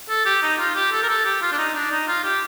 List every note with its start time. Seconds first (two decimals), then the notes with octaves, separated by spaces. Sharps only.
0.09 A4
0.25 G4
0.42 D#4
0.59 F4
0.75 G4
0.92 A4
1.03 A#4
1.08 A4
1.25 G4
1.42 F4
1.52 D4
1.58 D#4
1.74 D4
1.91 D#4
2.07 F4
2.24 G4